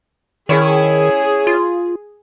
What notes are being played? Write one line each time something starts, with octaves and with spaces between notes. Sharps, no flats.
D#3 C#4 E4 G#4 C#5
F4